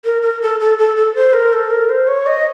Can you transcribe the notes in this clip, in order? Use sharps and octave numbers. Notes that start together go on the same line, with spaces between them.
A#4
A#4
A4
A4
A4
A4
C5
A#4
A4
A#4
C5
C#5
D#5